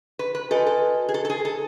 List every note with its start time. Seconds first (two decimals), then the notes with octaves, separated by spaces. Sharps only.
0.19 B4
0.35 B4
0.51 F#4 A4 B4 D#5 G#5
0.67 A4
1.09 G#4
1.14 A4
1.25 A4
1.30 G#4
1.45 A4